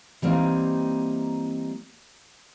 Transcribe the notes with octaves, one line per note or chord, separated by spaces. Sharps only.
E3 G3 A#3 C4 D#4